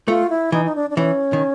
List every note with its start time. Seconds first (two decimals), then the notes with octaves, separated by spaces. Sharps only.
0.08 A3 F4
0.30 E4
0.52 E3 D#4
0.65 D#4
0.76 D4
0.90 D4
0.97 E3 C#4
1.33 D#3